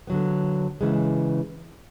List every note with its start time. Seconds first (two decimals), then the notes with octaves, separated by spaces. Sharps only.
0.07 D3 F#3 B3
0.81 C#3 E3 G#3